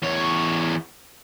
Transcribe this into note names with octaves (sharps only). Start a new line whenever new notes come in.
E2 C#5